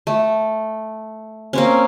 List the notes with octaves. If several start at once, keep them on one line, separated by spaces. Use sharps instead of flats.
A3
A#3 C4 C#4